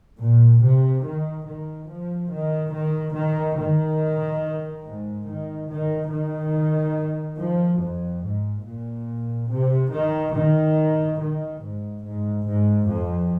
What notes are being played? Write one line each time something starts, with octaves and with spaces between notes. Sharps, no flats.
A#2
C3
D#3
D#3
F3
D#3
D#3
D#3
D#3
G#2
D#3
D#3
D#3
F3
F2
G#2
A#2
C3
D#3
D#3
D#3
G#2
G#2
G#2
F2